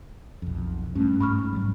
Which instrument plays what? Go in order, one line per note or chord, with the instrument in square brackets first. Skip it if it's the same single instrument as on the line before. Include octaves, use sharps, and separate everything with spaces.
[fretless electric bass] B1 F2
[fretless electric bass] G2 [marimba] A3 C#4
[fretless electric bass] G#2 [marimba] B5 C#6 F6
[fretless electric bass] G#2 F#3 G3